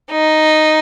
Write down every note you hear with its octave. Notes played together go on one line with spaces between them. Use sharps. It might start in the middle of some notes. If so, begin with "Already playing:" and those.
D#4